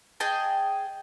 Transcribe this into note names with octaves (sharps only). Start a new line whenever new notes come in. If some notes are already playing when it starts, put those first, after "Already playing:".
G#4 D#5 G5 A5